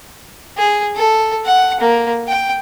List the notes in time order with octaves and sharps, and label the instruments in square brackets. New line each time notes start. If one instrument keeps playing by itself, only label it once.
[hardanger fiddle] G#4
A4
F#5
A#3
G5